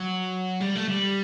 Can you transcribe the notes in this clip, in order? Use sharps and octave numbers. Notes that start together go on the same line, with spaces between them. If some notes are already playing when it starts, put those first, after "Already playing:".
Already playing: F#3
G3
A3
G3